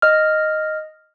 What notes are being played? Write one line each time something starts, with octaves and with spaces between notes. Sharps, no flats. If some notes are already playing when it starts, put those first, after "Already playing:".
D#5 F6